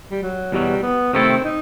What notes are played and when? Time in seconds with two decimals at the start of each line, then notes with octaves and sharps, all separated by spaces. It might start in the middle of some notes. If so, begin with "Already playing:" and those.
0.11 G3
0.22 F#3
0.52 E2 B2 F#3 G3
0.83 B3
1.13 C3 D#3 A3 C4 E4 A4
1.44 D#4